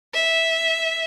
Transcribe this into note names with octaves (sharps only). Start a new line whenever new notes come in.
E5